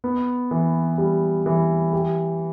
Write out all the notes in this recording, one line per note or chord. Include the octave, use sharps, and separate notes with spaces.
B3
E3
G3
E3
G4